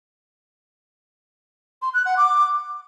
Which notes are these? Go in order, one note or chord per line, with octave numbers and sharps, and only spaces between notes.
C6
F#6
F#5
D6